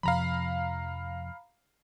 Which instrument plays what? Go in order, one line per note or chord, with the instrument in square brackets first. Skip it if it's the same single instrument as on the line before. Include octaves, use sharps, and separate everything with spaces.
[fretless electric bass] F2 C3 F3 [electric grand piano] F5 A#5 B5